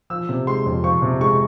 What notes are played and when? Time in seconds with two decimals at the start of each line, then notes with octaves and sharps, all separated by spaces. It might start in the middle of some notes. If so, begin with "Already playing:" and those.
0.10 F3 E6
0.29 C3
0.47 G#3 C6
0.66 F2
0.84 F3 C#6
1.02 C3
1.21 G#3 C#6